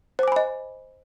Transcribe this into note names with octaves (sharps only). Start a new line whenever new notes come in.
C5 D#5 G#5 B5 D6